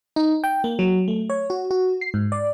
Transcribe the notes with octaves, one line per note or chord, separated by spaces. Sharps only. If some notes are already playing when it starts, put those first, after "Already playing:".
D#4
G5
A#3
F#3
A3
C#5
F#4
F#4
C7
G#2
D5